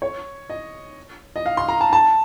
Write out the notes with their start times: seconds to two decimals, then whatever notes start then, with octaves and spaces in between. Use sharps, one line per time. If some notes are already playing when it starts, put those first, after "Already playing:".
0.02 C#5
0.50 D#5
1.36 D#5
1.46 F5
1.57 C6
1.69 A#5
1.81 A5
1.93 A5